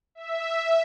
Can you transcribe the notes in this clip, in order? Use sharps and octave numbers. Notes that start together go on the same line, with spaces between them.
E5